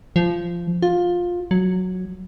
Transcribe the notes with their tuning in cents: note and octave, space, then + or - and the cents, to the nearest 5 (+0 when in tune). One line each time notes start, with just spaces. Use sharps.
F3 -15
F4 +15
F#3 -5